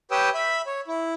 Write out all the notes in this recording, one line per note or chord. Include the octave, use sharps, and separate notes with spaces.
G4 B4 C#5 G5 D#6 E6
E5 B5
C#5
E4